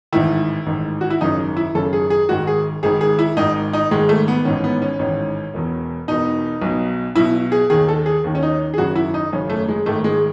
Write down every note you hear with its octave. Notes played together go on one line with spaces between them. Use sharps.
A1 G#2 D#3 E4
A1 G#2 D#3
F#4
E4
G#1 F#2 C#3 D#4
E4
G#1 F#2 C#3 A4
G#4
G#4
G#1 G#2 D#3 F#4
G#4
G#1 G#2 D#3 G#4
G#4
E4
G#1 G#2 D#3 D#4
D#4
G#1 G#2 D#3 G#3
A3
B3
A1 G#2 D#3 C#4
B3
C#4
A1 G#2 D#3 C#4
E1 E2 B2
E1 E2 B2 D#4
B1 B2
B1 B2 E4
G#4
D#2 D#3 G#4
A4
G#4
D#2 D#3
C#4
D#4
G#4
G#1 F#2 C#3 F#4
E4
D#4
G#1 F#2 C#3 C#4
A3
G#3
G#1 G#2 D#3 A3
G#3